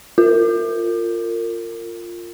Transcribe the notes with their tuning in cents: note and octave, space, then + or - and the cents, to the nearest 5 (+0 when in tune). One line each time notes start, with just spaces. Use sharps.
F4 +0 A#4 -30